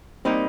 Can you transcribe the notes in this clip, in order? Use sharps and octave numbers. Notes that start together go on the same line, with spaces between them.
G3 A#3 C4 D#4